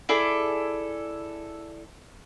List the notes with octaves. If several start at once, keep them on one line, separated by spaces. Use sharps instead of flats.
E4 G#4 A4 D5